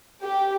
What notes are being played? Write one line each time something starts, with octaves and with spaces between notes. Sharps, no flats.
G4